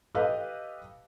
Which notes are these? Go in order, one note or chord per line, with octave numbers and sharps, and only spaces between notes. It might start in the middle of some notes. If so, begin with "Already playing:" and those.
G4 A4 B4 D#5 F5